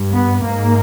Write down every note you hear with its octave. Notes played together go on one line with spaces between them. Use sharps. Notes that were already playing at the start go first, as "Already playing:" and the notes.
Already playing: G2
B3
G#2 A#3